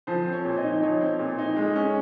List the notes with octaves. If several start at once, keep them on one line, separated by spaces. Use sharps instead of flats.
F3 C5
C4
C#5
A#2
D#5
D#4
F3 C#5
C4
A#2
D#4
G#3
C#4